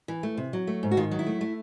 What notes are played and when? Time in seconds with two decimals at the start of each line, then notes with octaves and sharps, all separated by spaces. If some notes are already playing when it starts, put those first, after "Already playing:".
0.08 E3
0.23 A3
0.37 C3
0.53 F#3
0.67 A3
0.83 G#2
0.91 F#4
0.97 D#3 F4
1.11 F#3
1.19 E4
1.26 A3
1.41 A3